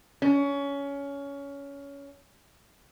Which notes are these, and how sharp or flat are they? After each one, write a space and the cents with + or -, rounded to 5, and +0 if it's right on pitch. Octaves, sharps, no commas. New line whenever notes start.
C#4 +20